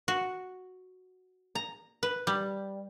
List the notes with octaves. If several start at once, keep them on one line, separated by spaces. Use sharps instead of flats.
F#4
A#5
B4
G3